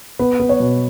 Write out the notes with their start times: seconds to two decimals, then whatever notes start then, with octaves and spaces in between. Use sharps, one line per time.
0.19 B3 B4
0.40 B3
0.49 C#5
0.60 B2